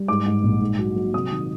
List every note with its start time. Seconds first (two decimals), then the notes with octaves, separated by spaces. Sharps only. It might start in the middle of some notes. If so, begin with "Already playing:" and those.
Already playing: G3
0.08 G#2 D6
0.26 G#2
0.43 A#1
0.61 G#2
0.79 F#3
0.96 F#3
1.14 C3 D#6
1.31 D#3